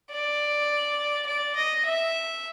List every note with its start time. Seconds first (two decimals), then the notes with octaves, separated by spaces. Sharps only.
0.12 D5
1.27 D5
1.56 D#5
1.85 E5